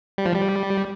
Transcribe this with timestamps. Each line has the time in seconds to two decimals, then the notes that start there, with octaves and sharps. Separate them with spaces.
0.18 G3
0.25 F3
0.34 G3